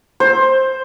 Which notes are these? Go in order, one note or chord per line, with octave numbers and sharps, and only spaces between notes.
C5